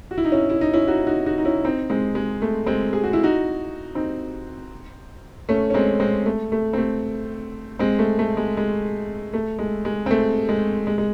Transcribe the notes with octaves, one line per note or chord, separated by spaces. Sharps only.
F#4
E4
D#4
C#4 E4
E4
D#4
C#4 E4
D#4 F#4
D#4 F#4
D#4 F#4
D#4
C#4 E4
C4 D#4
G#3 C4
G#3
A3
G#3 C4
G#4
F#4
E4
D#4 F#4
C4 D#4
A3 C#4
C#4
G#3 C4
G#3 C4
A3
A3
C4
A3
G#3 C4
A3
A3
G#3
G#3
A3
G#3
G#3
C4
A3
G#3
G#3
G#3